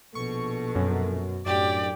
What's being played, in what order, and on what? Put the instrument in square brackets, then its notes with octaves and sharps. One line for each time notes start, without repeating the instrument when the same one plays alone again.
[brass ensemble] A#1 A4 [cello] B2 [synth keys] C#6
[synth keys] F#2
[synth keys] F#2 [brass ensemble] A2 D4 [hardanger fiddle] G4 [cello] D5